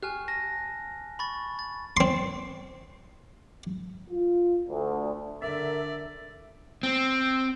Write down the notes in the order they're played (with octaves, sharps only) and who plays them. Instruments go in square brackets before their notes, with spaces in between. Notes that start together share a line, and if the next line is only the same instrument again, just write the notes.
[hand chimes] G4 [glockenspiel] G#5 F6 F#6
[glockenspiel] A5 [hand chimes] A#6
[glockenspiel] B5 C#6 A6
A6
[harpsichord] C4 C6
[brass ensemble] F4
D2
[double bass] D3 [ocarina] A#4 [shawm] D5 [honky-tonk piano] E5
[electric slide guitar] C4